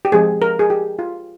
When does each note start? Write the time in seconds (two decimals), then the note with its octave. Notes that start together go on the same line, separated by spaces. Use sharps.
0.05 G4
0.12 F3 G#3 C4 G#4
0.42 A#4
0.59 G#4
0.70 G4
0.99 F4